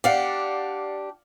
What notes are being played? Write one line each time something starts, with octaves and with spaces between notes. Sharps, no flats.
D4 G4 D5 F5 F#5